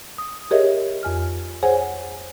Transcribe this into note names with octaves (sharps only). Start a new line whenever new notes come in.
D#6
G4 G#4 A#4 C#5 D#5 E5
F2 G#5 F6
G#4 C5 C#5 F#5 G#5